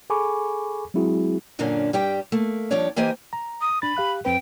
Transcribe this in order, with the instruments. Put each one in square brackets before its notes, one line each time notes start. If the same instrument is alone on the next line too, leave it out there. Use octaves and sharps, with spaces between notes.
[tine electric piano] G#4 A4 G#5 B5 C#6 D6
F#3 G#3 C4 E4 F#4 G#4
[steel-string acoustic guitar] F#2 A#2 D3 A#3 C#4 D4
G2 G3 G4 G5
A3 A#3
D#2 F3 G3 D4 C#5 D5
E3 A#3 G4 C5 D#5 G#5
[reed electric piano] A#5
[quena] D#6
[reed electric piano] D4 A6 [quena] B5
[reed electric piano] G4 F5 F#6
[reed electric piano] F2 C4 B4 [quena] G5